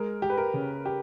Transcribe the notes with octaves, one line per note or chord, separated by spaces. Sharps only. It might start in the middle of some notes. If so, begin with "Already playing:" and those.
Already playing: G#3 A#4
G4
B4
A#4
C#3
G4